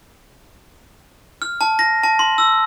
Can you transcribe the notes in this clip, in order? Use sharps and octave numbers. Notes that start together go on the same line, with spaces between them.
F6
A5
A#6
A5
C6
E6